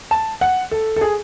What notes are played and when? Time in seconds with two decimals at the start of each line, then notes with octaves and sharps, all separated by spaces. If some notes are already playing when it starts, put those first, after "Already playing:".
0.11 A5
0.41 F#5
0.71 A4
0.96 A4
1.01 G#4